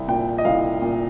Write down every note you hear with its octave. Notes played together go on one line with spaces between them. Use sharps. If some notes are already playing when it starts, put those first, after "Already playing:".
Already playing: C2
A#2 G5
D#5
C2 F5
A#2